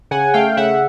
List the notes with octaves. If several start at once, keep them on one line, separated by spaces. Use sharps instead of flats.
C#3 F#5 G#5
A3 F5 G5
C#3 E5 F#5